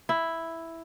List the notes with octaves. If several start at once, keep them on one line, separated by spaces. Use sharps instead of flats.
E4